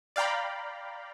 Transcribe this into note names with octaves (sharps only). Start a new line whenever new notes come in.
D5 F5 G5 A#5 B5